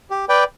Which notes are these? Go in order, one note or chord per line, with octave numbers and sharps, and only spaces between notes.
G4
B4 D5 G5